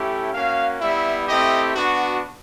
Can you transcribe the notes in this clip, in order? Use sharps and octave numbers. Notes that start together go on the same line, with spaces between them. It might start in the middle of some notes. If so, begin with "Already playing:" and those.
Already playing: A3 C#4 E4 G4
A#3 C#4 F#4 F5
G3 B3 E4 E5
A3 C4 E4 G4 D#5
B3 D4 F#4